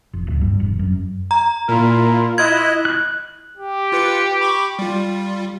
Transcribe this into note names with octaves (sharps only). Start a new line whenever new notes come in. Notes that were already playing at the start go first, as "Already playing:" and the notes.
F1
D1
G2
E1
F#2
A#5
A#2 E4 F4 A#4
E4 D#5 F#6 G#6
F#6
G4
F4 B4 C#7
B5 C#6 D6
G3 F4